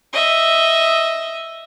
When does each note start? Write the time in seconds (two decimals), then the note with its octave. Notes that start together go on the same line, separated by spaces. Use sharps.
0.13 D#5 E5